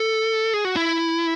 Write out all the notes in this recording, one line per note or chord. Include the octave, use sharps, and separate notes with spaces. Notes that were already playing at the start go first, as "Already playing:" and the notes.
Already playing: A4
G#4
F#4
E4